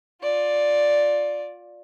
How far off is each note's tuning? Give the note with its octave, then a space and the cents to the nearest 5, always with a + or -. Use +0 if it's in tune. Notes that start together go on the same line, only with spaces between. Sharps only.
F4 +20 D5 +0